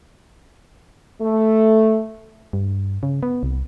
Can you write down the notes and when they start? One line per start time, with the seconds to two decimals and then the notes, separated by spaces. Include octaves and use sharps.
1.20 A3
2.53 G2
3.03 C#3
3.23 B3
3.43 C2